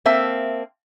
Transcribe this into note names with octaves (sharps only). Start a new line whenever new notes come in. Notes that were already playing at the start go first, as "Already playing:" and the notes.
A#3 C4 E5 A5